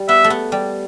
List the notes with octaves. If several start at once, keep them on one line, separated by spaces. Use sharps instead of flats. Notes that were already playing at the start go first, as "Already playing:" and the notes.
Already playing: G3
B3 E5
A3
B3
G3